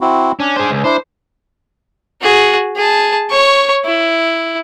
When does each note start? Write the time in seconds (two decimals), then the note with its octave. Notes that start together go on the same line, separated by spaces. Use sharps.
0.01 C4 E4 F#4
0.40 C#4 D4
0.56 G#4 C5
0.71 C#2
0.84 D4 E4 C5
2.21 F#4 G#4
2.76 G#4 A5
3.30 C#5 C#6
3.85 E4